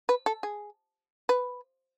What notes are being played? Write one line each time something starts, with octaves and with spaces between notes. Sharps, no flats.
B4
A4
G#4
B4